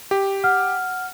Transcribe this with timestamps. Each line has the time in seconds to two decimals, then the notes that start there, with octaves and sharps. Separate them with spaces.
0.11 G4
0.44 F#5 F6